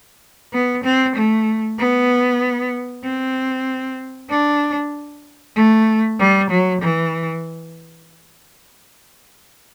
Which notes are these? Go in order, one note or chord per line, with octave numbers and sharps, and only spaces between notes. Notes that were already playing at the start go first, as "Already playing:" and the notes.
B3
C4
A3
B3
C4
D4
A3
G3
F#3
E3